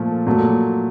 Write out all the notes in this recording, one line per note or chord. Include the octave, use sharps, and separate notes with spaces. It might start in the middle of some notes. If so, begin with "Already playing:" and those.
Already playing: A#2 F3 A3
A#2 F#3 A3